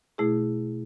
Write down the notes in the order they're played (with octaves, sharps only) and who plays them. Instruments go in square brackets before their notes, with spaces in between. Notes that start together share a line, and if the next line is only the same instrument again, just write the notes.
[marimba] B2 A3 E4 G#4